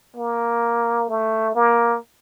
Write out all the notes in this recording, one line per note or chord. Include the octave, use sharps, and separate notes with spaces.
A#3
A3
A#3